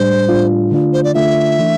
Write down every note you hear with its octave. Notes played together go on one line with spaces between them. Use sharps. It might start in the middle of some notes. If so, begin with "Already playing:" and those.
Already playing: A2 G3 D4 C5
A2 G3 D4 F4
D3 A3 D4 F4
C5
D5
D3 A3 D4 F4 E5
E3 A3 D4